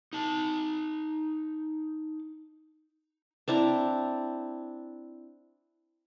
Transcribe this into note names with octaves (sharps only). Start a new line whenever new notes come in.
D#4 A5
C4 D4 E4 A#5